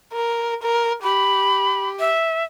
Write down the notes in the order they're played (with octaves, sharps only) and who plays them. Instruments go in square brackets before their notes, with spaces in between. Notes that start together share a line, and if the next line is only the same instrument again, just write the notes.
[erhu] A#4
A#4
[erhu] G4 [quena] B5
[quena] E5